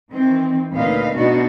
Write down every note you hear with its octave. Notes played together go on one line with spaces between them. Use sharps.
D#3 E3 C4
D2 A#2 D#4 B4 F5
B2 A3 B3 D4 D#4 F#4